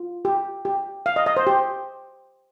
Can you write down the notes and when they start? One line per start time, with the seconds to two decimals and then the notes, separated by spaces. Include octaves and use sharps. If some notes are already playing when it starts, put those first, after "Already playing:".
Already playing: F4
0.25 G4
0.65 G4
1.06 F5
1.16 D#5
1.26 D#5
1.37 C5
1.47 G4